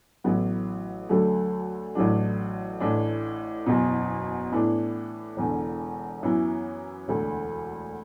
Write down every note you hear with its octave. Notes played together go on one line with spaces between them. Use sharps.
A1 A2 F#3 B3
D2 D3 F#3 A3
A1 A2 F#3 D4
A1 A2 E3 D4
F#1 E2 B2
A2 E3 B3 D4
E1 E2 D3
F#2 E3 B3 E4
E1 D2 D3